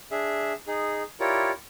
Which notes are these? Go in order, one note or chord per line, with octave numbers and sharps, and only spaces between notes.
D4 G#4 E5
D#4 G#4
E4 F4 G4 A#4 C#5 D5